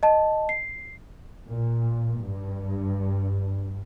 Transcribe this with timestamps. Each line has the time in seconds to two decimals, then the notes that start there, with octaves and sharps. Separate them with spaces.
0.03 D#5 A5
0.49 C7
1.46 A#2
2.22 G2